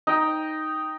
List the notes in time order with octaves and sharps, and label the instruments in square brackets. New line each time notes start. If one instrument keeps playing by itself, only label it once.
[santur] D#4 G5